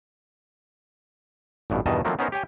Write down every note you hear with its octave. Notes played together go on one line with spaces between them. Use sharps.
A1 G2 B2
E2 G2 B2 D#3 D#5 A5
D#3 F3 F#3 A3 A#3 C4
B3 C#4 D#4 A#4 C5
G4 C#5 G5 G#5